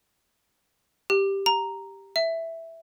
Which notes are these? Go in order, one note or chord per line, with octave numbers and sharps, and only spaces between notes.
G4
A#5
E5